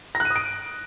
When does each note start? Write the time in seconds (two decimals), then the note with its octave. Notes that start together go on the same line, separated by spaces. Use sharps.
0.15 A#6
0.20 F#6
0.25 D#7
0.30 D#6
0.36 D7